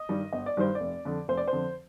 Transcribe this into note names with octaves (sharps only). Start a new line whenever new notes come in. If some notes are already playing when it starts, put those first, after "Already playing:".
Already playing: D#5
G2 D#3 G3
G1 D#5
D5
G2 D#3 G3 C5
D5
F1
F2 D3
F1 C5
D5
C5
F2 D3